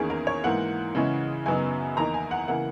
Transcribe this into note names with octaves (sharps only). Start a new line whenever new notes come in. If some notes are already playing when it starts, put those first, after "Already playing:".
Already playing: E2 D#3 A#3 C#4 G#4
A#4
C#5
G#2 E3 A#3 F#5
C#3 E3 G#3 C#4
F#2 C#3 F#3 B3 D#4 G#5
E2 D#3 A#3 D#4 A#5
G#5
F#5
C#3 E3 A#3 F#5